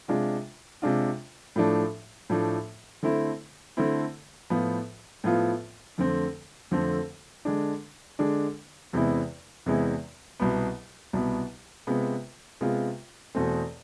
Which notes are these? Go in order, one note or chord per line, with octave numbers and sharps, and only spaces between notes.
C3 G#3 D4 F4
C3 G#3 D4 F4
A2 F3 A3 D4
A2 F3 A3 D4
D3 A3 C4 E4
D3 A3 C4 E4
A2 F3 B3 F4
A2 F3 B3 F4
F2 D3 A3 C4
F2 D3 A3 C4
D3 G#3 D4
D3 G#3 D4
E2 C3 G#3 B3 E4
E2 C3 G#3 B3 E4
C2 B2 B3
C2 B2 B3
C3 G#3 B3 F4
C3 G#3 B3 F4
E2 B2 A3 C4